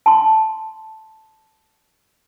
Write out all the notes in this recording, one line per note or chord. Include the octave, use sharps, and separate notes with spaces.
A5 C6